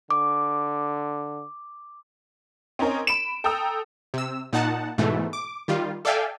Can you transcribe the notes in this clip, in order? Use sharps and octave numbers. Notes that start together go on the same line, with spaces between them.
D3 D6
C4 C#4 D#4 A#4 C#5
B5 D7 E7
A4 G5 A#5 D#6 E6
C3 E6
A#2 D#4 F#5 A5
G#2 B2 E3 A3
D6
D#3 G3 F4
A4 D5 E5 F5 G5 G#5